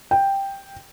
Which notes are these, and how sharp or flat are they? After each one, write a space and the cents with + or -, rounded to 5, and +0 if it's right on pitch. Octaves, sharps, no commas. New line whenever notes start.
G5 +5